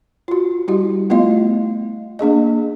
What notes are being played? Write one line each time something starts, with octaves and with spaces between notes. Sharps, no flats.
F4 F#4
G3 E4 F#4 G4
A3 B3 E4 F4 D#5 F5
A#3 D4 G#4 D#5